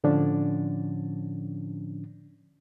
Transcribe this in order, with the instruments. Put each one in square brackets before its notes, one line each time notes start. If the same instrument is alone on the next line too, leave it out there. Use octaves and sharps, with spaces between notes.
[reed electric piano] A2 D3 F3 C#4 D4